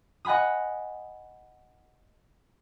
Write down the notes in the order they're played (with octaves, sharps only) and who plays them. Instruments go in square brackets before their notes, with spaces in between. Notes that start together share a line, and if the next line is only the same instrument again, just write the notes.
[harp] D#5 F#5 G#5 B5 D#6